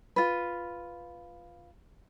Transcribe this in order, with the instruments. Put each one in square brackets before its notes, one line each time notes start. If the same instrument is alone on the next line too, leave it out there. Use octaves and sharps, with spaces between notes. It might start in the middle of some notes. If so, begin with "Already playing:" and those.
[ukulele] F4 B4